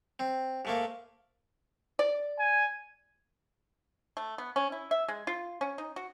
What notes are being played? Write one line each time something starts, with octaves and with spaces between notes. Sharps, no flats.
C4
G#2 A3 A#3
D5
G#5
A3
B3
C#4
E4
E5
G#3
F4
C#4
D#4
F#4